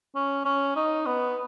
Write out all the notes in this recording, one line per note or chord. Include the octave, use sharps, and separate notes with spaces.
C#4
C#4
D#4
B3